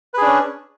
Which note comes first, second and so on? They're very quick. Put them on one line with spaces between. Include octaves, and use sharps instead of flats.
B4 G#4 D4 C#4